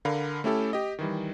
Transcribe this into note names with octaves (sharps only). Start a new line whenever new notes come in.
D3 A#4 F5 B5
A3 C#4 E4 G4 A4
G4 D#5
D#3 E3 G3